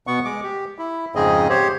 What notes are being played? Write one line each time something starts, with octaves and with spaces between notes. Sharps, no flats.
B2 B3 F#5 C#6
G#3 D6
G4
E4
F2 G#2 C#3 C4 G#4 D#5
G4 C5 C#5